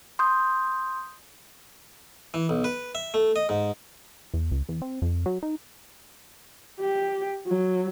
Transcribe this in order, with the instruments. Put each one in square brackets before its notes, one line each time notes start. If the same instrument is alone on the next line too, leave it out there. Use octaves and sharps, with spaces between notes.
[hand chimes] C6 D#6 G6
[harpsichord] E3
B1
B4
E5
A3
D#5
G#2
[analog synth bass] E2
C#2
E2
C4
F2
F#3
D#4
[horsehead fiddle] G4
F#3